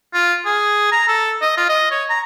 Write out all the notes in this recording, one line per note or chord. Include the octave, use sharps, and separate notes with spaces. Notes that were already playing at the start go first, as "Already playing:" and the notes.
F4
G#4
A#5
A4
D#5
F4
D#5
C#5
A#5